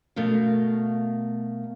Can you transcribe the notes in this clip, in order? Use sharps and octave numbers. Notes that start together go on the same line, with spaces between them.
B2 A3 A#4 F5